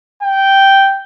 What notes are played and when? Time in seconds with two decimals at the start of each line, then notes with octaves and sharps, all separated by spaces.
0.23 G5